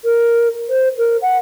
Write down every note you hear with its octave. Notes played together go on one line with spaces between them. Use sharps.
A#4
C5
A#4
F#5